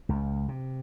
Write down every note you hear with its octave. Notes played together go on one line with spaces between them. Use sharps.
C#2
C3